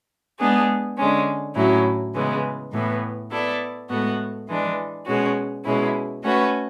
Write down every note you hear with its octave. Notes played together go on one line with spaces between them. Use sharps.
G#3 B3 D4 G#4
D3 G#3 C#4
A2 F#3 C#4 E4
C#3 E3 G#3 B3
A2 E3 B3
B3 E4 A4 D5
A2 G#3 B3 F#4 A4
E3 G#3 D4
B2 G#3 C#4 F#4
B2 G#3 C#4 E4
A3 C#4 F#4 B4